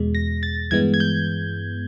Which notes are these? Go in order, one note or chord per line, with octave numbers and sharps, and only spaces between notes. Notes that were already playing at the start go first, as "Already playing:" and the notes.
Already playing: E2 B2 G#3
A#6
A6
G2 E3 G#3 B3 G#6
G#6
G6